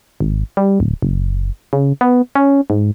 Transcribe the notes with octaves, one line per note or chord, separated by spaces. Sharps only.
G#1
G3
D1
F#1
C#3
B3
C#4
G#2